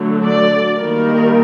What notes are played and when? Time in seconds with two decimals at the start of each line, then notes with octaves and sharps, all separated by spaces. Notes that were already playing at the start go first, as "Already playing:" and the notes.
Already playing: D3 F#3 A3
0.25 D5
0.78 D#3 G3 A#3 A#4